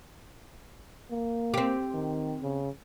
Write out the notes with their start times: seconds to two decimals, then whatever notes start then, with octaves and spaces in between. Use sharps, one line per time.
1.11 A#3
1.54 C4 G4
1.94 D#3
2.43 C#3